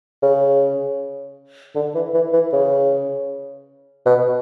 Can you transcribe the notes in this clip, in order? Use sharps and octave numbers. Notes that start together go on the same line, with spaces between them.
C#3
D3
E3
E3
E3
C#3
B2